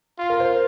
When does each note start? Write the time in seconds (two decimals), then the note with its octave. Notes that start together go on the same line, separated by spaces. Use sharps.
0.19 F4
0.30 A#4
0.40 C5